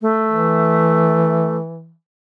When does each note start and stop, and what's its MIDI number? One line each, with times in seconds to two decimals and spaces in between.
0.01 1.57 57
0.31 1.93 52